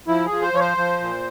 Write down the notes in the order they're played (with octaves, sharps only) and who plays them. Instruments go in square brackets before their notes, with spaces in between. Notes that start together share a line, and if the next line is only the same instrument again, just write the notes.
[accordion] F3 E4
G#4
F3
C5
F3 C#5
C5
F3
A#2